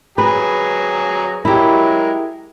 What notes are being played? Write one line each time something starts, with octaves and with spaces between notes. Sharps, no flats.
F#3 G#4 B4 A#5
F#3 G#3 E4 G4 A#4